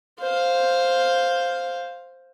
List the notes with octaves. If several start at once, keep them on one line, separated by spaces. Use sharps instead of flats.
C5 F5